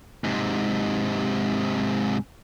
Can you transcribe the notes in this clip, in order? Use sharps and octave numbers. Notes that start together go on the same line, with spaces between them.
G#2 C3